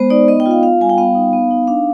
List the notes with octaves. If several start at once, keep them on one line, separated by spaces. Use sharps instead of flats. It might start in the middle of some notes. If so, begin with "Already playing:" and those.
Already playing: G#3 B3 C5
D#4 D5
B3 D#5
G5
F4
F5
F4 F5
G3 G#5
G5
B3 F5
D#4
B3
D#4
D4 F5